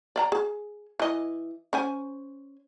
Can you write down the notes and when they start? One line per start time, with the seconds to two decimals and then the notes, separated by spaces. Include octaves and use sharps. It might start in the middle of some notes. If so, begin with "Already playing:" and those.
0.16 D5 F5 A#5
0.32 G#4
1.00 E3 D#5
1.73 C#4 C5 G#5